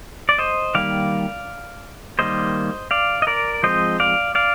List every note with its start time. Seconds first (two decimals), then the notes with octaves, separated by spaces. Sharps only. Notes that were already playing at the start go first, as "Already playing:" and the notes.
0.29 D5
0.39 C5 D#5
0.75 D#3 G3 A#3 D5 F5
2.19 D#3 G3 A#3 C5 D#5
2.91 D5 F5
3.22 D#5
3.27 A#4 D5
3.63 F3 G#3 C4 C5 D#5
4.00 D5 F5
4.35 D5 F5